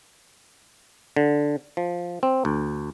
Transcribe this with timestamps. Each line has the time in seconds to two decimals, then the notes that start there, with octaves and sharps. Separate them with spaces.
1.16 D3
1.77 F3
2.23 C4
2.45 D2